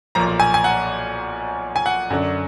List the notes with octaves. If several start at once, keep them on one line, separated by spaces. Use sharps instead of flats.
B1 A#2 F3 A#5
G#5
G#5
F#5
G#5
F#5
F#2 D3 F#3 D4